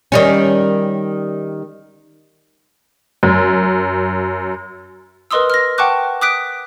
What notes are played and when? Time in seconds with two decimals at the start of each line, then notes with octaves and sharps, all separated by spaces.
0.12 D#3 G3 C#4
3.23 F#2
5.31 A#4 B4 D#5 C6 D#6 E6
5.50 F6 A#6
5.78 F#5 G5 A5 C#6 D6 F#6
6.22 D6 D#6 F#6 B6 D7